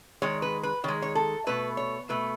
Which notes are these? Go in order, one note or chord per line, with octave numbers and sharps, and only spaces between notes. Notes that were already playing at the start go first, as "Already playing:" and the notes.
D#3 G#3 C#5
B4
B4
D#3 G#3 C#5
C#5
A4
B2 A3 B4
C#5
B2 A3 B4